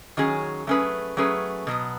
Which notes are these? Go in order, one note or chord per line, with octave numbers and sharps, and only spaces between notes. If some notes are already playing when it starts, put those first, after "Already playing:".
D#3 F#3 C#4 G#4
F#3 A3 C#4 G#4 B4
F#3 A3 C#4 G#4 B4
B2 F#3 B3